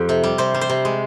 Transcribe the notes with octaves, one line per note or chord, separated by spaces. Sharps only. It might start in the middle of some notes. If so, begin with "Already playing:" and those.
Already playing: F2 G4
C3
G3
C3 C5
G3
C5
C3
G#3